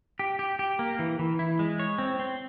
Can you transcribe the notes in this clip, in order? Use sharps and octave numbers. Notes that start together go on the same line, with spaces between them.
G4
G4
G4
A#3
E3
E3
E4
G#3
C#5
C4
C4